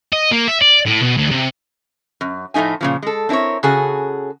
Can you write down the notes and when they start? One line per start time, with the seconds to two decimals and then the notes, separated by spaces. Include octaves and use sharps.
0.13 D#5
0.31 A#3
0.48 E5
0.62 D5
0.86 A2
1.02 B2
1.17 D2
1.31 C3
2.21 F#2
2.54 A2 F3 A3 D#4 G#5
2.81 A#2 C#3 F3
3.03 G#3 A4
3.29 C4 D4 E4 A#4 C#5
3.63 C#3 F#4 G#4 A4